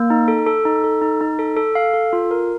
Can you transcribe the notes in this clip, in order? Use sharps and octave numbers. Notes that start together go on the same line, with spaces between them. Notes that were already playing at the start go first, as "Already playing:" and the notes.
Already playing: A#3
D#4
A4
A4
D#4
A4
D#4
D#4
A4
A4
F5
A4
F4
A#4